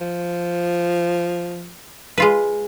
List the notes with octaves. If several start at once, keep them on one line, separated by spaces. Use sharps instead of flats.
F3
G#3 F4 B4